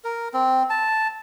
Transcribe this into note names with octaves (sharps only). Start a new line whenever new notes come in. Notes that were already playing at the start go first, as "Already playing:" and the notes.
A#4
C4
A5